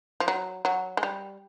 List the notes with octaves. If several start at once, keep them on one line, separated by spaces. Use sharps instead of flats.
F3
F#3
F#3
G#3
G3